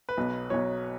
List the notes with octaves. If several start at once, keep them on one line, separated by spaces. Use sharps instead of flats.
B4
B1 B2 F#3
B1 B2 F#3 C#5